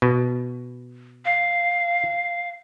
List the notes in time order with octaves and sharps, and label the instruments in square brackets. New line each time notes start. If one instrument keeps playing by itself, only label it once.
[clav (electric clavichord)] B2
[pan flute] F5